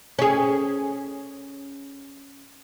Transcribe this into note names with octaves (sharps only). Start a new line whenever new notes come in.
C#4 G#4